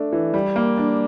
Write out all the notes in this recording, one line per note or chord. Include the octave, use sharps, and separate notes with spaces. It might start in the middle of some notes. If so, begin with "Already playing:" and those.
Already playing: A3 D4 A4
E3
G3
A#3
D4